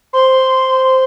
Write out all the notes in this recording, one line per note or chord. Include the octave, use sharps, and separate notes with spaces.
C5 C6